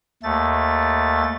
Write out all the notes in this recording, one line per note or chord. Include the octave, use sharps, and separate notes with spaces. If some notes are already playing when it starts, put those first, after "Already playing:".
D#2 A3 A6